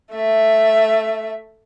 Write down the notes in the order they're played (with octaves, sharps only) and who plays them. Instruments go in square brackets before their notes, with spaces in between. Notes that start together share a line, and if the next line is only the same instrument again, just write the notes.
[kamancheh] A3 E5